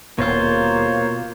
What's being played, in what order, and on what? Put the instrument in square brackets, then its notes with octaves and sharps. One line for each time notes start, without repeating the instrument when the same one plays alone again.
[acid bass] D#1 [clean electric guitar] B2 F4 [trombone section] A#3 [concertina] C5 C#5